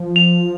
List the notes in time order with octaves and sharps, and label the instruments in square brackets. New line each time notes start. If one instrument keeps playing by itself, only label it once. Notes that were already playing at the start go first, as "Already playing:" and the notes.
Already playing: [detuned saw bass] F3
[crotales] F7